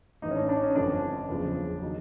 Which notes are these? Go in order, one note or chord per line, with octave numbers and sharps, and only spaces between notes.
A1 A2 E3 D#4
C#4
D4
D4
C#4
G1 F2 D3 F3 D4
F#1 E2 C#3 F3
D#3 F#3